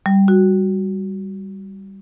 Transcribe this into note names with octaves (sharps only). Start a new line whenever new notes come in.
G3
F#4